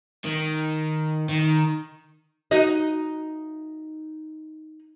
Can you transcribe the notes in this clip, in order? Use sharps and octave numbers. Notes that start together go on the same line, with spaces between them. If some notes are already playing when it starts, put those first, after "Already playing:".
D#3
D#3
D#4 F#4 D#5